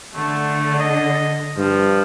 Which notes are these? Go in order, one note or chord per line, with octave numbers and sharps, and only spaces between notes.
D3 A3
D#5
G2 F3